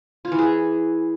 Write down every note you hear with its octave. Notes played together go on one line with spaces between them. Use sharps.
F4
E3
G#4